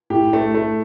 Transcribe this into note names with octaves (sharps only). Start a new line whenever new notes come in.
A2 G4
A3
A3